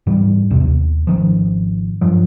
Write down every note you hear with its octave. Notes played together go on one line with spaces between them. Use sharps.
G#2 E3 G3
B1 E2 C3
D#2
G#1 D#3 F3
G2 F3 F#3